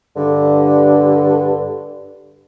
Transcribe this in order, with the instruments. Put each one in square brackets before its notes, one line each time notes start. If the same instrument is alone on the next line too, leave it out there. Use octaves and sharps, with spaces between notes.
[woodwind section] G2 D3